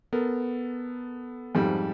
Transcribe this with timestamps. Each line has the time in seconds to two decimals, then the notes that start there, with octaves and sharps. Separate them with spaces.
0.13 B3 A4 A#4
1.55 F2 G#2 G3